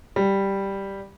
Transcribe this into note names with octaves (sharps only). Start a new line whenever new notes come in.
G3